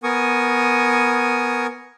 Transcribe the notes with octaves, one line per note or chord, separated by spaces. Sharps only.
B3 A#4 G#5 C#6 D#6